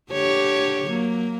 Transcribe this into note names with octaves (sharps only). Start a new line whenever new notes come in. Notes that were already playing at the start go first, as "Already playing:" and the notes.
D3 G4 C#5
F#3 A#3